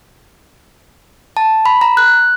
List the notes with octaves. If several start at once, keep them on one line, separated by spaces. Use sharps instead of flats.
A5
B5
A#5
F#6